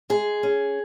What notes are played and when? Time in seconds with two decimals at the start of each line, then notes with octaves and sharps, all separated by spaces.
0.10 G#3 G#4
0.43 C#4